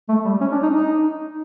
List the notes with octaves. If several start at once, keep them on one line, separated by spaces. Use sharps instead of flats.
A3
G3
C#4
D4
D#4
D#4